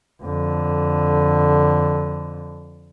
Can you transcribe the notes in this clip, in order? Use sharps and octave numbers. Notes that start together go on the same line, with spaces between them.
F2 D3